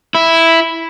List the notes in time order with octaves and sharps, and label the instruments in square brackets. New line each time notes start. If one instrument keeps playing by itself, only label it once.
[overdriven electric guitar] E4